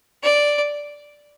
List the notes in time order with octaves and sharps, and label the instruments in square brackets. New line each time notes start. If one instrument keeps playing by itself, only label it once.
[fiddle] D5